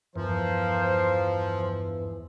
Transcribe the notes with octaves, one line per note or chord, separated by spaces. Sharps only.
E2 G2 E3 F3 A#4 C5